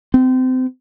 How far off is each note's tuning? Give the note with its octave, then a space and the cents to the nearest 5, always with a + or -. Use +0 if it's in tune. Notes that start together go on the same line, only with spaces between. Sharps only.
C4 -30